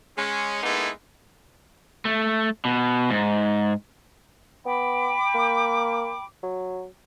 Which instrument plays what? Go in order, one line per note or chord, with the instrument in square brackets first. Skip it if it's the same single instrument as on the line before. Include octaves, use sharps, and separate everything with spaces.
[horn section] G#3 C#4
G#3 A#3 B3 D#4 E4 A4
[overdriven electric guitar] A3
B2
G#2
[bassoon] B3 [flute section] G5 B5 D6
[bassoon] A#3
F#3